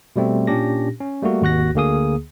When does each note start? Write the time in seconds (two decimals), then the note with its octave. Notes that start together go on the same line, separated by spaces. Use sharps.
0.16 B2 G3 A3 C4
0.47 A#2 C#4 D4 G4 A#6
1.01 C#4
1.22 G3 A3 A#3 F#4
1.41 G#1 D#2 F#4 F#6 A#6
1.75 D2 D3 A#3 G#4 D#6